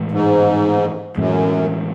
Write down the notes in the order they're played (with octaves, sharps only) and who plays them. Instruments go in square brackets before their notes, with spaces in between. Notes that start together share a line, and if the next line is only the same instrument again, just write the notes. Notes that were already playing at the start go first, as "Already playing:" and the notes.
Already playing: [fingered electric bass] A2 E3 G#3
[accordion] G#2
[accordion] F#2 [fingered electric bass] A2 E3 G#3